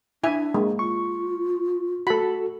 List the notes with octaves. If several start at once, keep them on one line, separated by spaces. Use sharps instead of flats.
D4 E4 E5 G#5
G#3 A#3
F4 C#6
A3 F#4 A4 B5